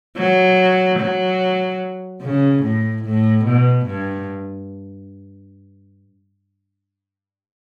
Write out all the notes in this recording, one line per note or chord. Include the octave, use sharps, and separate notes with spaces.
F#3
F#3
C#3
A2
A2
B2
G2